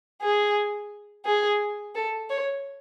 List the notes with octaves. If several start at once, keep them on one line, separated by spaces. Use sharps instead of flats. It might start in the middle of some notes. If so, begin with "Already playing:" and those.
G#4
G#4
A4
C#5